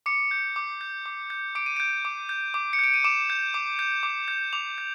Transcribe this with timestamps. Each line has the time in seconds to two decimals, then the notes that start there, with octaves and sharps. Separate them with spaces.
0.06 D6 C#7
0.31 G6
0.56 D6
0.81 G6
1.06 D6
1.30 G6
1.55 D6 D7
1.66 D#7
1.77 G6 D7
2.05 D6
2.29 G6
2.54 D6
2.73 C#7
2.79 G6 D7
2.94 D#7
3.04 D6 E7
3.30 G6
3.54 D6
3.79 G6
4.03 D6
4.28 G6
4.53 D6 F7
4.78 G6